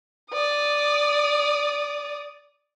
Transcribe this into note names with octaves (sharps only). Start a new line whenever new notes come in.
D5 D#6